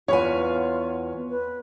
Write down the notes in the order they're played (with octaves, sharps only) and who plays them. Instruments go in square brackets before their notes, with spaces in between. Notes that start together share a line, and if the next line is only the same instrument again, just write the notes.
[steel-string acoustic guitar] E2 B3 G#5 [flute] F4 [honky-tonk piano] C#5
[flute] B4